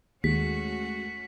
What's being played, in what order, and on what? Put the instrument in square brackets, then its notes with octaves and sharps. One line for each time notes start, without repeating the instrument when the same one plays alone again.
[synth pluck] D#2 [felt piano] G#3 [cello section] A3 C#4 F#4 [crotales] B6